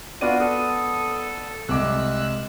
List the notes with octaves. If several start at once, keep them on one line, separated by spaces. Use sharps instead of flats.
B3 D4 F4 F#4 D5 F#5 D#7
A4 D#6
C2 G#3 D6 E6 F#6